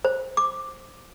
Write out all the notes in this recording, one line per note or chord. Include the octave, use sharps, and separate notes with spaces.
C5
D6